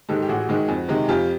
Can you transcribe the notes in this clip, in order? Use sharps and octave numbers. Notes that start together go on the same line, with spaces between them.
G#2 D#3 G#3 G4 A4
G4
A1 F#4 G#4
G#2 D#3 G#3
F2
C3 D#3 G#3
F2 F4 G4